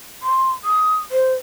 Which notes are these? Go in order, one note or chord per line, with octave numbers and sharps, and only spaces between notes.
C6
D#6
C5